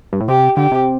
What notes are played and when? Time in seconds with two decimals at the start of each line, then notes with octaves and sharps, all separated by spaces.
0.13 G2
0.20 A2
0.28 C3 G4
0.57 D3 G4
0.72 C3